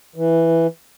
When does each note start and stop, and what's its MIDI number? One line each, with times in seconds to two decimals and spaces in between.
0.16 0.67 52